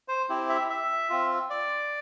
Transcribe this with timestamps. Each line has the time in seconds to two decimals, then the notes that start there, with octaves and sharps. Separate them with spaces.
0.08 C5
0.29 C4 E4 G4
0.49 E5
0.70 E5
1.10 C4 F4
1.50 D5